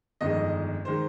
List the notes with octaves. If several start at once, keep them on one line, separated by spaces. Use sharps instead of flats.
G1 F2 D#3 G#3 D#5
D#3 G#3 C5